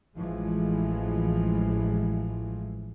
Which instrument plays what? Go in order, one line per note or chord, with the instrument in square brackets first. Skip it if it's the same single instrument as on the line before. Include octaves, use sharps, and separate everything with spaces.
[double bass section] A1 E3 F3 G#3